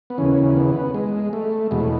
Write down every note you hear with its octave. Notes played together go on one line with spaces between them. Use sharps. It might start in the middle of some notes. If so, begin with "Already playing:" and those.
B3
D#2 C#3 E3 C#4
B3
G#3
A3
E2 B2 G#3
A3